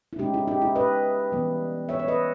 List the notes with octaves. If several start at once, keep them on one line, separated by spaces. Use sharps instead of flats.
E4
C#3 G#3 C#4 D#4 G4
E4
D#4 G4
E4
B4 D#5
E3 G3 B3
C#5 E5
C#5
B4 D#5